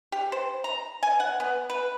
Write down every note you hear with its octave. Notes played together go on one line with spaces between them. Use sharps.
G4
C5
A#5
G#5
F#5
B3
B4